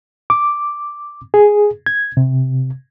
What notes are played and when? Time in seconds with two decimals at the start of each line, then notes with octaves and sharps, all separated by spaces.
0.30 D6
1.34 G#4
1.86 G#6
2.17 C3